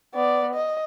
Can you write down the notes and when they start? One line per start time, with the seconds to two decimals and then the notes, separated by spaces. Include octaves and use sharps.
0.14 B3 D5
0.54 D#5